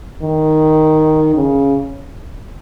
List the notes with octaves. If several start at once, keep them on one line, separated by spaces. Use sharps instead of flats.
D#3
C#3